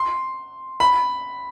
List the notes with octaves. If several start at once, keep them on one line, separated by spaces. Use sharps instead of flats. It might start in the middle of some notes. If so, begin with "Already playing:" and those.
Already playing: C6
B5